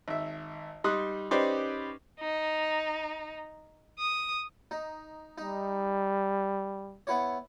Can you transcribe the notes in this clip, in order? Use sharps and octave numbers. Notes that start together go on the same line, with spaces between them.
G#1 E5
G3 D#4 C6 D#6 F#6
C#4 D#4 G4 B4 C5 D5
D#4
D#6
D#4
G3 D#4
B3 E4 C#5